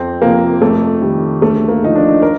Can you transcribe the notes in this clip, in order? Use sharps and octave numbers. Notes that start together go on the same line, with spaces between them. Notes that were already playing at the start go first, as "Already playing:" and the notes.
Already playing: F2 C4
C3 F3 A#3
F2 A3
D#3 G3
D2 A3
A#3
D3 F3 D#4
D4
A#4